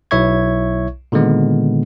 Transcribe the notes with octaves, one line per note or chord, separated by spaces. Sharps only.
B1 E4 C#5 E5 C#6 G#6
A#2 D3 D#3 G#3 B3